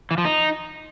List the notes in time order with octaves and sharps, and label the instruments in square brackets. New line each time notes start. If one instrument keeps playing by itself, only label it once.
[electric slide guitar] E3
F3
D#4